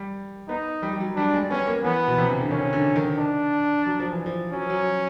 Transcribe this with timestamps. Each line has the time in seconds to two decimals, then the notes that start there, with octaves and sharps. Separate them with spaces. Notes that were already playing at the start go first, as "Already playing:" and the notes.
Already playing: G3
0.49 B3 D#4
0.82 G3
0.93 G3
1.00 F#3
1.16 G3 D4
1.34 G#3
1.50 B3 C#4
1.66 A#3
1.84 E3 B3
2.08 B2
2.18 C3
2.29 C#3
2.41 D3
2.51 D#3 C#4
2.73 D3
2.96 D#3
3.18 D4
3.86 F#3
4.00 F3
4.12 E3
4.26 F3
4.53 F#3 C#4
4.61 F3
4.70 F#3